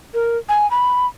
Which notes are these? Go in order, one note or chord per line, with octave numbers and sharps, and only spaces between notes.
A#4
G#5
B5